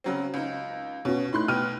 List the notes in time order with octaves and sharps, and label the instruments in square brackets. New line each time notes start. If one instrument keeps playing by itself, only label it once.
[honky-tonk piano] C#3 F#3 C4
C#2 D#4
[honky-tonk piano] B2 [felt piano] C#4 F#4
[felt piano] A3 D#4 E4 [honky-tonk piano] B5 C6 F#6
[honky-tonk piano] B2 G5 D#7 [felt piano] F6